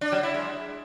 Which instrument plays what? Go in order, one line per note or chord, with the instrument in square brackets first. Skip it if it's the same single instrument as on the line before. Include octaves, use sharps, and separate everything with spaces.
[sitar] D4
F#3
E4
G#3